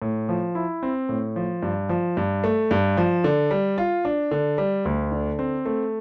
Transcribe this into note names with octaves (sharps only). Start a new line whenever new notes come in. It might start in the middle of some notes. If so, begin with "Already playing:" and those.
A2
F3
E4
C4
A2
F3
G2
F3
G2
A3
G2
F3
D3
G3
F4
D4
D3
G3
D2
D3
C4
A3